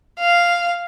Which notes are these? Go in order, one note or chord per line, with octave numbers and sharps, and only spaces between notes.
F5